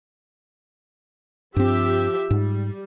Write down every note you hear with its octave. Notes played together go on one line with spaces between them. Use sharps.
G2 F3 C4 G4 E5
G#2 G3